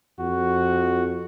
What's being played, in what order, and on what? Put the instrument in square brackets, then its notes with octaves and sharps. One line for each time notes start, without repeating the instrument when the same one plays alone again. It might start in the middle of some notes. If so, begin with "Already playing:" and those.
[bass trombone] F2 [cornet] F#4